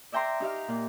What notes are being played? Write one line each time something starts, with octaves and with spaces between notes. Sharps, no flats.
D5 E5 G5 A#5 C6
D#4 G4 F5 F6
A#2